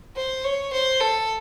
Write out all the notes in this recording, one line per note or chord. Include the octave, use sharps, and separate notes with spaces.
C5
C#5
C5
A4